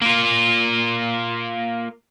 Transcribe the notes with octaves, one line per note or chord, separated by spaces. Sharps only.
A#3 F4